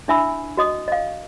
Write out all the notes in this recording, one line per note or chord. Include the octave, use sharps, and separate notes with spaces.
D4 E4 E5 G#5 B5 E6
F#4 D#5 D#6
D#5 F5